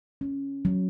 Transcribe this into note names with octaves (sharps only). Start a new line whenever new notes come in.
C#4
F#3